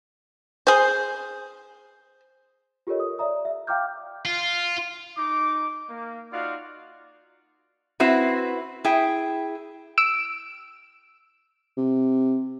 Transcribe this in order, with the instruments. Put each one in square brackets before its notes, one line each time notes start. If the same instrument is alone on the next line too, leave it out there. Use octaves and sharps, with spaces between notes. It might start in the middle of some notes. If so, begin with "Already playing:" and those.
[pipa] G#4 C5
[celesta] F4 G4 A4 A#4 C#5 D#5
D#6
D5 E5 A#5 D#6
E5
F5 G5 A#5 D6 F6 G6
[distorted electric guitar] F4
[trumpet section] D#4 D6
A#3
D#4 F4 F#4 D5 F5
[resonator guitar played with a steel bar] C4 E4 F#4 B4
E4 G#4 G5
[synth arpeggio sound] E6 D7 E7
[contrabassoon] C3